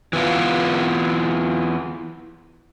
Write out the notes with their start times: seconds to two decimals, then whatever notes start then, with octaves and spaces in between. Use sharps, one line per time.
0.13 E3 B3 F4